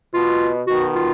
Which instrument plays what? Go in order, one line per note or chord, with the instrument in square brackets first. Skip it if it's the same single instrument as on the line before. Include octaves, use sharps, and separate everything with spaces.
[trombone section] B2 [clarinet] F4
[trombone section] B2 D#3 [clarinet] F#4
[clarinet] F4